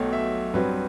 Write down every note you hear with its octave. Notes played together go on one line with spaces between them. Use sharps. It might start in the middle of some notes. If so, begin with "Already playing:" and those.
Already playing: B1 B2 F#3 A3 G5
E5
G2 F#3 C4 B4